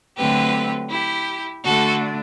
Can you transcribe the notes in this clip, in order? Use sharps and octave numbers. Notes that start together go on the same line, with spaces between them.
D3 F#3 A3 C4 G4 B4
E4 G4
D3 A3 D4 F#4 A4